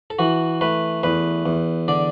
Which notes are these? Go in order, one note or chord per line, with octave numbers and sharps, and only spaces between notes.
A4
E3 F#4
A3 B4
E2 B4
E2
D3 D5